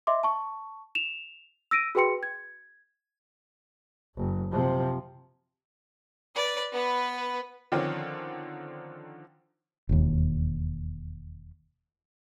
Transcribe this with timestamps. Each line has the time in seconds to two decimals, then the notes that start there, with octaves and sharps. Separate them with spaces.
0.07 D#5 E5 C6 D6
0.23 A5 C#6
0.95 E7 F7
1.71 E6 A#6 D7 D#7
1.95 F#4 G#4 B4 G5 C6 C#7
2.23 G#6
4.16 F#1
4.51 C3 F3
6.35 B4 D5
6.72 B3 B4
7.72 D3 D#3 F3 C4 C#4
9.89 E1 D#2